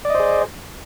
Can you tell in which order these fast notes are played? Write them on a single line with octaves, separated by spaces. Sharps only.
D5 D#5 C5 G#4